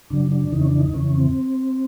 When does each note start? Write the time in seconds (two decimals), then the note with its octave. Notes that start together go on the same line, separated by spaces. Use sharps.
0.10 F#2 C#3 F#3 D4
0.32 D4
0.52 F2 C#3 E3 D#4
0.60 C#4
0.66 D4
0.80 D#4
0.94 F2 C#3 E3 C#4
1.16 C4